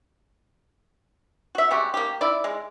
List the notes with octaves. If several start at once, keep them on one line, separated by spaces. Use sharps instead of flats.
F#4 E5
G3 G#3 F#4 G4
A#3 G4
E4 D5
G#3